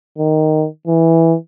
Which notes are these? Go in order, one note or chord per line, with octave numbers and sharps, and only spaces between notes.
D#3
E3